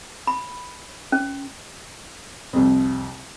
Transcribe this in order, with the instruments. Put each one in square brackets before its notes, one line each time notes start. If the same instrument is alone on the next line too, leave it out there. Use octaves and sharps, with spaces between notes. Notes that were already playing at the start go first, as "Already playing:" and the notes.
[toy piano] B5
C#4
[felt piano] C2 F2